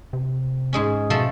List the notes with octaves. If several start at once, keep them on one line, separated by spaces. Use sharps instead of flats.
C3
G#2 G#3 C#4
B2 F3 A3 A4